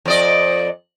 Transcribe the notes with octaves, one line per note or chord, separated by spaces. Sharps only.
F2 D5 D#5